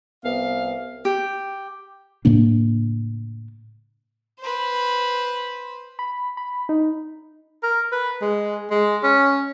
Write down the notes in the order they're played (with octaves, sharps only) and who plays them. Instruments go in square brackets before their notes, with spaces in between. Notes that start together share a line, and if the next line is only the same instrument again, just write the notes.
[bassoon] C2 [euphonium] B3 [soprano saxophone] F5
[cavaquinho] G4
[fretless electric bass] A2 C#3 A#3 D4
[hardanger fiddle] B4 C5
[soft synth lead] B5
B5
D#4
[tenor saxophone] A#4
B4
G#3
G#3
C#4